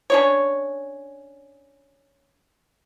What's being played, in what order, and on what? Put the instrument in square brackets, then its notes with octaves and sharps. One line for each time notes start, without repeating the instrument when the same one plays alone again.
[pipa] C#4 D4 C#5